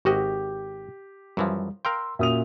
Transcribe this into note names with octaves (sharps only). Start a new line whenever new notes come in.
G#1 F#4 G4 D#5
F#2 E3 F3 G3
A#4 F5 G5 C6 E6
A#2 C#4 F#4 E5 D#6 F7